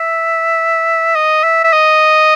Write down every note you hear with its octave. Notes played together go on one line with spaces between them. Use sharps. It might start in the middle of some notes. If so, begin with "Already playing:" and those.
Already playing: E5
D#5
E5
E5
D#5